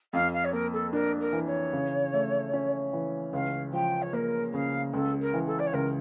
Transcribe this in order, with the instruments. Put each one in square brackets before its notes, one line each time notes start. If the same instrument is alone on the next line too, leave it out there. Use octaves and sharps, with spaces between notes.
[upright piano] F2 [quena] F5
[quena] F5
C#5
[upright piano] A#3 [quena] A#4
[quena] A4
[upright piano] D4 [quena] A#4
[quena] A#4
[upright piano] E3
[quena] C#5
[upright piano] C#3
A3
C#4
E3
[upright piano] C#2 [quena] F5
[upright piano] F3 [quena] G5
[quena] C#5
[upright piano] A#3 [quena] A#4
[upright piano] C#3 [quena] F5
[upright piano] C#2 [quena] A4
[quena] A#4
[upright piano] E3
[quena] A4
D5
C#5
[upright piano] C#2 [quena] A#4